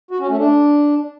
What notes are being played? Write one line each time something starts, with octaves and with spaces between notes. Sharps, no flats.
F#4
C#4
A3
D4